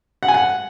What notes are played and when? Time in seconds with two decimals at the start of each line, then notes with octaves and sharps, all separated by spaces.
0.23 F#5
0.28 G#5
0.34 F#5